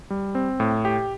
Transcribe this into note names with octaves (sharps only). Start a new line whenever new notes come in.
G3
C4
A2
G4